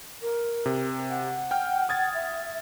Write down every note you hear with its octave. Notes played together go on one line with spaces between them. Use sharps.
A#4
C3
F#5
G5 F6
D#6 G#6 A6
E5